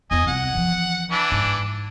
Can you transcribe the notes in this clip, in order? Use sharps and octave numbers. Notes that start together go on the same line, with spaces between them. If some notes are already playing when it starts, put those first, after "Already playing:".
E2 E4 D#5 G#5
C2 F4 F#5
E3 F3
E3 D4
G#2